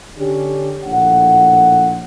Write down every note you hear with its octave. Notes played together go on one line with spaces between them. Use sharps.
D3 C#4 D4 G4
A#1 A2 F#5